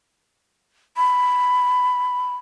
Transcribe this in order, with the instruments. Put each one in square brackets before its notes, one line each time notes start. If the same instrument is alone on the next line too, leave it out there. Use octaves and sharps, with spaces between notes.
[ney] B5